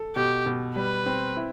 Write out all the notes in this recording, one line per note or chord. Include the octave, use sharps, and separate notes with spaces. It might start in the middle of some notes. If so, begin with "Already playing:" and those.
Already playing: A4
B2 G4
B2
G3 B4
C4
E4